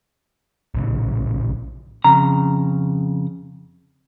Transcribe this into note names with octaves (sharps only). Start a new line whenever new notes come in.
A#1 A2 C#3
F2 C#3 A#5